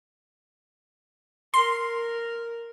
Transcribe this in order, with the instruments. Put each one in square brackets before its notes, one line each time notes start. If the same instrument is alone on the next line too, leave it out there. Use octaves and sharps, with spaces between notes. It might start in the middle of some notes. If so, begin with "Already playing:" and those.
[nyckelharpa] A#4 [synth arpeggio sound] C6